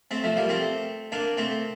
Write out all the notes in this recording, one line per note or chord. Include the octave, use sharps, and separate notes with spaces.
A3 C4
F3 A3
G3 A#3
A3 C4
A#3 D4
A3 C4